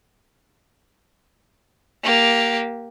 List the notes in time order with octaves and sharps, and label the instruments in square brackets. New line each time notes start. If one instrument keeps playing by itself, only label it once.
[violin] A#3 G4